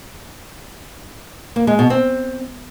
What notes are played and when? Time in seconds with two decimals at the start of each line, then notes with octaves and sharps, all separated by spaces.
1.56 A#3
1.67 G#3
1.79 B2
1.90 C4